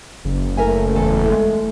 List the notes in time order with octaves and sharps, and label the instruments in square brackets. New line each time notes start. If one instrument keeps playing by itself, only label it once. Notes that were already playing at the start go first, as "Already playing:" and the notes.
[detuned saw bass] F#1
[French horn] A3 [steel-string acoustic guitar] A#4 E5 G#5
[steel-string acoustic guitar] E2 A4
G#3